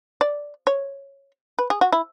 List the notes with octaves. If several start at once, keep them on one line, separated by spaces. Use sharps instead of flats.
D5
C#5
B4
G#4
F#4
E4